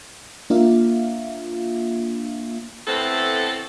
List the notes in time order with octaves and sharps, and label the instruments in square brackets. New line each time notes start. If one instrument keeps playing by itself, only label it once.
[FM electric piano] A#3 D4 F4 E5 F5
[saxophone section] A2 A3 B3 C4 A4